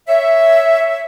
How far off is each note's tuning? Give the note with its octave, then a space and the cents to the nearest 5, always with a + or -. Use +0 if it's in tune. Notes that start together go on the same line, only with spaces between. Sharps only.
C#5 +0 E5 +0